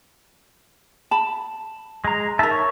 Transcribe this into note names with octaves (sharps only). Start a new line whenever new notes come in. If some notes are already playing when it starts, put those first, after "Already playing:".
A5 B5
G#3 A#5
D#4 A#4 E5 A5
C#5